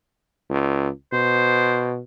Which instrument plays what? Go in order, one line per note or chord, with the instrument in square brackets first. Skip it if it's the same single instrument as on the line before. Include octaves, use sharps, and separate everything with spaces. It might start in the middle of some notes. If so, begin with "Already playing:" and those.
[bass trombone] C#2
[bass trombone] B2 [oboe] C5